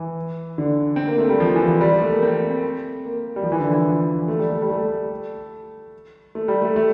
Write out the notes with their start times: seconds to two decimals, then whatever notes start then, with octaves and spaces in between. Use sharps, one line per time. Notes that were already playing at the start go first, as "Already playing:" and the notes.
Already playing: E3
0.58 D3
0.96 C4
1.08 A#3
1.18 A3
1.29 G3
1.40 F3
1.55 E3
1.68 F3
1.81 G3
2.02 A3
2.13 A#3
2.22 C4
3.05 A#3
3.36 G3
3.43 F3
3.52 E3
3.60 D3
3.73 E3
3.88 F3
4.28 A3
4.39 G3
4.50 A3
4.62 G3
4.70 A3
6.35 A3
6.48 G3
6.62 A3
6.76 A3